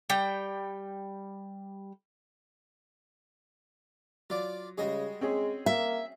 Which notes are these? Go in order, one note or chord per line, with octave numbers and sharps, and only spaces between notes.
G3 G5
F#3 F4 D5
C#3 G3 G#3 F#4 G#4 D#5
G#3 C4 C#4 G#4
A#3 E5